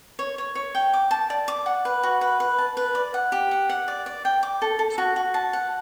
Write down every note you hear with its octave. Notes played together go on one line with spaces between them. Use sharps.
C#5
C#5
C#5
G5
D6
A5
D5
D6
F#5
B4
F#4
B4
B4
A5
B4
D5
F#5
G4
F#5
F#5
D5
D5
G5
D6
A4
A4
F#4
F#4
A5
F#5